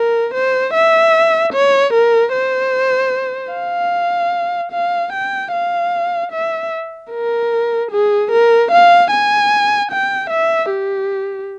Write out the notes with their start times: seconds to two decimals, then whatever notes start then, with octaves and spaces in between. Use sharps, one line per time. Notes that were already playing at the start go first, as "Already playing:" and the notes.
Already playing: A#4
0.34 C5
0.73 E5
1.53 C#5
1.93 A#4
2.33 C5
3.53 F5
4.72 F5
5.13 G5
5.52 F5
6.32 E5
7.11 A#4
7.91 G#4
8.31 A#4
8.71 F5
9.11 G#5
9.91 G5
10.30 E5
10.71 G4